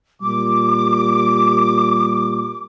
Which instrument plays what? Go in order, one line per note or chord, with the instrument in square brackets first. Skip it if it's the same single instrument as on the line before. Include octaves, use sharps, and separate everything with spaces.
[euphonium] A#2 [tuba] G3 [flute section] D6